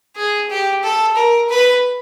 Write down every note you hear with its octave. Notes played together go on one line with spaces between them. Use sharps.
G#4
G4
A4
A#4
B4